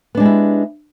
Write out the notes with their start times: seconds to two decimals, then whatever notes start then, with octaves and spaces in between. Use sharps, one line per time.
0.15 B3
0.17 D4
0.20 G#3
0.23 G4
0.25 E4